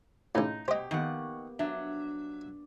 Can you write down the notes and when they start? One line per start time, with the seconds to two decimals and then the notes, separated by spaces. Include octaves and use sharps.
0.35 C#2 A2 D#4
0.68 B2 G4 C5 D#5
0.91 D#3 A#3 B3 G4 F#5
1.59 F#3 D4 E5